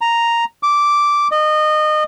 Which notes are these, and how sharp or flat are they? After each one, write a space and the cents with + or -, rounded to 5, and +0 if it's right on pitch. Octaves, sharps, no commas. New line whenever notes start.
A#5 +0
D6 -5
D#5 -25